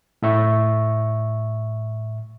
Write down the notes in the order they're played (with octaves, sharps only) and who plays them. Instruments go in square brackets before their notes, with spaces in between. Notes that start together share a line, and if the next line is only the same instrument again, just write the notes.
[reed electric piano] A2 E5 C#6